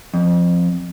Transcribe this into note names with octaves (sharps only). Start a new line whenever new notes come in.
F2